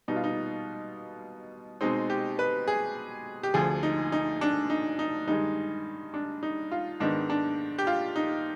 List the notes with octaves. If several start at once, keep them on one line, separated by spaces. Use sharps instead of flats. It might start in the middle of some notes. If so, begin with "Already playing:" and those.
B2 G3 B3 D#4
F4
D#4
B2 G#3 C4 D#4
G4
B4
G#4
G4
D2 D3 F3 G#4
D#4
D#4
D4
D#4
D#4
G2 D#3 G#3 D#4
D4
D#4
F4
G#2 D#3 B3 D4
D4
G4
F4
D#4